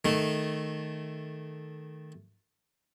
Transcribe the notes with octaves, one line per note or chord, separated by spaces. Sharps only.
D#3 A3